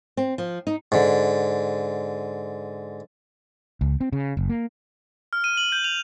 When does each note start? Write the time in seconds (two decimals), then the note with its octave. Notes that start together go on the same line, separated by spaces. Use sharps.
0.17 C4
0.38 F3
0.67 D#4
0.92 G#2 D3
3.81 C#2
4.01 C4
4.13 C#3
4.37 F#1
4.49 A#3
5.33 F6
5.44 D#7
5.57 F#7
5.72 G6
5.84 F7